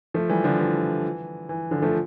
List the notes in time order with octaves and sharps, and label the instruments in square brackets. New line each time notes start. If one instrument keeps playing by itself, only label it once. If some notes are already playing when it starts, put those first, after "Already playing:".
[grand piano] F3 A3
E3 G3
D3 F3
E3
E3
D3 F3
F3 A3